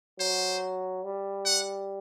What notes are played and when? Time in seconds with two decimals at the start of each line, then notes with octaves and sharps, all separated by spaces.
0.19 F#3 C5
1.04 G3
1.46 F#5